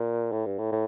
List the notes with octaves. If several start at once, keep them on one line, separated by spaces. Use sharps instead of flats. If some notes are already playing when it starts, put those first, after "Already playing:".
Already playing: A#2
A2
G2
A2
A2